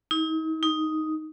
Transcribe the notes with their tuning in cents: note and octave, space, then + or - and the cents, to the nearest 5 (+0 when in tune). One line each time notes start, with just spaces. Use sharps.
D#4 +40
D#4 +5